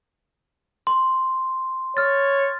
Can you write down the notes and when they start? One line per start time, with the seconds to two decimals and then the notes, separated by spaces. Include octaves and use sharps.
0.87 C6
1.97 C#5 F6 A6